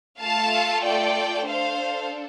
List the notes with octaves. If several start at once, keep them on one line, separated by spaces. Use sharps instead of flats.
A3 F4 A4 F5 A5
D5 G5
D4 A4 C5 F5